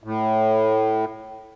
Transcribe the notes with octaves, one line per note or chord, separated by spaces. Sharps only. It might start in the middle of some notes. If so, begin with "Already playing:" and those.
A2